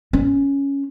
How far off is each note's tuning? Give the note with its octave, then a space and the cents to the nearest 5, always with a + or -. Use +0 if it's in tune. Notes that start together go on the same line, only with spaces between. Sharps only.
C#4 +5